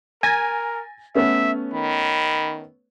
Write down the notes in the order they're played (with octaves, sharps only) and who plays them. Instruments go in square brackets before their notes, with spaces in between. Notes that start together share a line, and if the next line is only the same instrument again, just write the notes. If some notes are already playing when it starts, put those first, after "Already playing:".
[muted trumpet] A#4 [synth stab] G#5 [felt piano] A6 A#6
[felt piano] A3 B3 C#4 [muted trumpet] E5
[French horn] D#3 [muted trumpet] B5